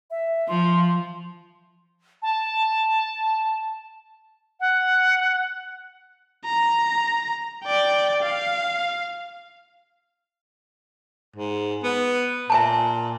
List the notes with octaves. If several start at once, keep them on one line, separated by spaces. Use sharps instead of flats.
E5
F3 C6
A5
F#5
A#5
D5 G5
F5
G#2
B3
A#2 E5 G#5 A5